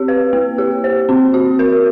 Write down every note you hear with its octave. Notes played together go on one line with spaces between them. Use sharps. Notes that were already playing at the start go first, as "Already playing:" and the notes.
Already playing: C4 G4
B4
A#3
G4
C5
C4
F#4
A#4